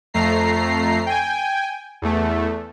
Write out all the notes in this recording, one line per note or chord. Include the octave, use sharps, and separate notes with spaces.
F2 A3 A#5 C7
G5 G#5
E2 A3